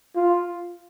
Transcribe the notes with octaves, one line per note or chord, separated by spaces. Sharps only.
F4